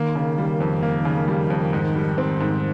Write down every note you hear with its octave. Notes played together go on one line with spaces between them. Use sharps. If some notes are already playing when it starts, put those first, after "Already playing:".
Already playing: D#3 A#3
C#3
G3
F2
A#3
C#3
G3
F2
G#2
G3
C4
G#2